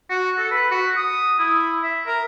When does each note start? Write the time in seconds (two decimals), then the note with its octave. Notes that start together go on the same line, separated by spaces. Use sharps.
0.10 F#4
0.38 A4
0.51 B4
0.71 F#4
0.96 D#6
1.39 E4
1.83 E5
2.07 A#4